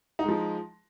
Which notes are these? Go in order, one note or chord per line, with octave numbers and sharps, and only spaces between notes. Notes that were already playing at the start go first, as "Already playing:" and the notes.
F3 G#3 D#4